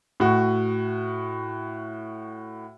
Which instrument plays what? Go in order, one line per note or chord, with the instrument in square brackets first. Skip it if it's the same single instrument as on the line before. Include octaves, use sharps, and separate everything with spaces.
[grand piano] A2 F#4